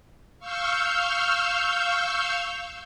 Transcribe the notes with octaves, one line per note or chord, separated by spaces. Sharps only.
F5 C#6 E6 F6 G6